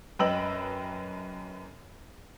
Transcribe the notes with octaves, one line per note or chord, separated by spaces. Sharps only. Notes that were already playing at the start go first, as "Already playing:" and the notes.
F#2 B4 D#5 G5 E6 F#7